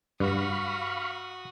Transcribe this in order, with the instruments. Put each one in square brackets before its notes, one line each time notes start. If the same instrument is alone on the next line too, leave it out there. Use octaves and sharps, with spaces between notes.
[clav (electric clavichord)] G2 [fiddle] F#4 D#6 [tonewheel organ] F5 B5 C#6